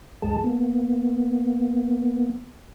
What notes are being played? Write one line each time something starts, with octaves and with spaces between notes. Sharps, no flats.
D2 G2 G#3 G#4 A5
A#3 B3